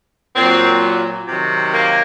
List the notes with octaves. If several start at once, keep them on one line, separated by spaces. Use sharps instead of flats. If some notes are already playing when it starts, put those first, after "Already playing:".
A#2 F#3 C4
C3 D#3 F#3
A#3